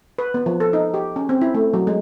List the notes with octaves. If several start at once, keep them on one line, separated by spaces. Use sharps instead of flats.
B4
B3
F3
A4
D#4
G4
C#4
C4
E4
A3
F#3
G#3